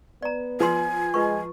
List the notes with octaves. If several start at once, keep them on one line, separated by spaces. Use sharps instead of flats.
B3 D5 A#5
F3 B4 G#5 C6
G#3 F4 B4 C#6